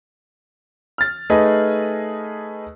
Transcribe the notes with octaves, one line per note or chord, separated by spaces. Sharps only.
F6 A6
A3 D#4 G#4 B4 D#5